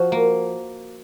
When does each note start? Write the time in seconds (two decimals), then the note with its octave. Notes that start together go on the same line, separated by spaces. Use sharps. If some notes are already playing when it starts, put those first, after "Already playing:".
Already playing: F3 F#4
0.12 A#3